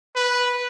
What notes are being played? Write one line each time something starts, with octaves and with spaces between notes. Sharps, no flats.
B4